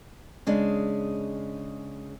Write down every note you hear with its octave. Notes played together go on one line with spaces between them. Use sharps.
C#3 G#3 D4